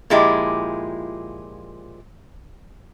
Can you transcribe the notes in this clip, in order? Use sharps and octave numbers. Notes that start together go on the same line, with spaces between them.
A#2 F3 G#3 E4 G4